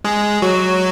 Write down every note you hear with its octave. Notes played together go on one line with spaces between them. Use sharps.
G#3 G#4
F#3 F#4